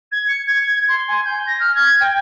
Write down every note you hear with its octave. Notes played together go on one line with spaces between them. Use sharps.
G#6
C#7
G#6
G#6
C6
G#5
G6
A#6
F6
G#6
G5